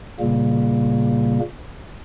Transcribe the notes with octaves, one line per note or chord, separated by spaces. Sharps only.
A#2 C#3 G3 A#3